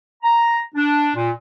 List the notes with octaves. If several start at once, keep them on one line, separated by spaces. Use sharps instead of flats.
A#5
D4
A#2